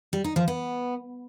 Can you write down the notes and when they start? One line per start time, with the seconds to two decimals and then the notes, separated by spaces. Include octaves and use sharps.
0.13 G3
0.24 D#4
0.36 F3
0.48 B3